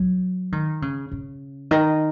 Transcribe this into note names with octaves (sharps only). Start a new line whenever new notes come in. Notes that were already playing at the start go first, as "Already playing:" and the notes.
Already playing: F#3
D#3
C#3
C#3
D#3